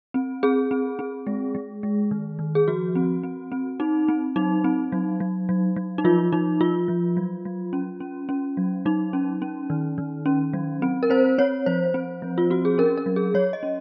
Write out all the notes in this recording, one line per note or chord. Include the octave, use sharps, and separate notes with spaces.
C4
C4 G#4
C4
C4
G#3
G#3
G#3
D#3
D#3
G#4
F3 F#4
C4
C4
C4
C4 D#4
C4
F#3 D#4
C4
F#3
F#3
F#3
F#3
D#4
F3 F4
F3 D#4
F3 F4
F3
F#3
F#3
C#4
C#4
C#4
F#3
F#3 D#4
C#4
C#4
D#3
D#3
C#4
F#3
C4
A#4
C4 C5
C4 C#5
F3 C5
C4
F3
F4
C4 F#4
G#4
C#4 A#4
A#4
F#3
G#4
F#3 C#5
D#5
C#4